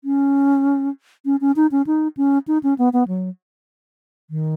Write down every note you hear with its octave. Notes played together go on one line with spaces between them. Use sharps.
C#4
C#4
C#4
D#4
C#4
D#4
C#4
D#4
C#4
B3
B3
F#3
D#3